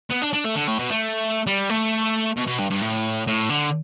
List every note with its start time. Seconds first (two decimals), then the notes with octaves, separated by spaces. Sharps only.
0.11 B3
0.23 D4
0.34 D4
0.45 A3
0.56 D3
0.68 A2
0.79 B2
0.91 A3
1.47 G3
1.70 A3
2.37 B2
2.47 B2
2.59 G2
2.71 G2
2.82 A2
3.27 A2
3.50 D3